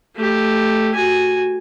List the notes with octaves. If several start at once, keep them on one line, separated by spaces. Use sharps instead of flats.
A3 G4
F#4 G#5